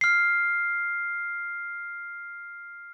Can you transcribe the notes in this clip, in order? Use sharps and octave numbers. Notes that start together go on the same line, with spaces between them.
F6 C7